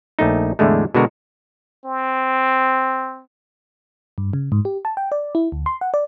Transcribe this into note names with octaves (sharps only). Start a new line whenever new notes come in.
A#1 A3 D#4
E2 A2 D3 G#3 A3
B2 D3 G#3 F#4 A#4
C4
G2
C#3
G#2
G4
A5
G5
D5
E4
D2
C6
F#5
D5